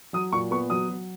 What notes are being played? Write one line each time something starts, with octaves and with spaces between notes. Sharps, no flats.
F#3 D#6
A#2 C#6
B3 C#6
F#3 D#6
F#3